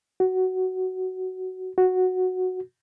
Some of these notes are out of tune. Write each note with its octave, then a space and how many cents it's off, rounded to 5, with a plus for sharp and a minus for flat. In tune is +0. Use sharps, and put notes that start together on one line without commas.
F#4 +10
F#4 -5